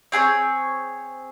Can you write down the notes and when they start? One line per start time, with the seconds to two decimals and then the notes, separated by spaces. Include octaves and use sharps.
0.12 C4 G#4 A4 C#5